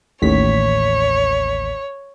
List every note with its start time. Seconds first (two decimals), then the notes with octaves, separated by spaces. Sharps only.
0.22 A1 D#2 C#5 B6